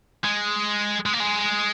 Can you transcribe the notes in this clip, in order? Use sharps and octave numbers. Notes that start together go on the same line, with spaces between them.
G#3
G#3
A#3
G#3